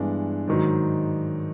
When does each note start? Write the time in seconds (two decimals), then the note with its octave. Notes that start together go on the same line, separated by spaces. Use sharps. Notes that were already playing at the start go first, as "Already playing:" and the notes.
Already playing: G2 E3 G#3 B3 D4
0.48 G#2 D#3 F#3